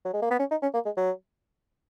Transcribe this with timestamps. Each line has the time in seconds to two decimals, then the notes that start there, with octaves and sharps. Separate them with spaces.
0.05 F#3
0.13 G#3
0.22 A#3
0.31 B3
0.39 C#4
0.51 D#4
0.62 C#4
0.74 A#3
0.85 G#3
0.97 F#3